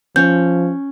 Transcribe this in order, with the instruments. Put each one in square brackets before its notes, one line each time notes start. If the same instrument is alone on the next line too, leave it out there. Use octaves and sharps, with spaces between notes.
[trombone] F3 [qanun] C#4 [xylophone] G6